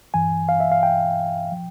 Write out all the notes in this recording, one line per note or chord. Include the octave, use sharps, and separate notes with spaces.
G2 E3 G#5
F5
E5
F5
G5
F3